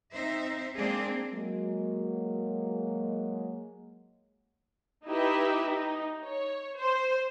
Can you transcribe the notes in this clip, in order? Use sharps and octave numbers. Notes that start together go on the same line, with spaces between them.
C4 D#4 C5 E5
G#3 A#3 C4 D4 G#4
F#3 G#3 A#3
D#4 E4 G4 B4 E5
D#4
C#5
C5